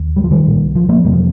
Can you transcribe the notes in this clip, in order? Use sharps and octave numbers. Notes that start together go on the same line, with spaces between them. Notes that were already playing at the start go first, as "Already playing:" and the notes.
Already playing: D#2
G3
F3
D#3 G3
C2 A#2
F3
F3 A#3
F2 C3 G3
F3